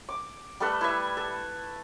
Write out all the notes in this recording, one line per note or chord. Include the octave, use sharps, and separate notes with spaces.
D6
G3 A3 A4 B4
E4 B4 E5
A4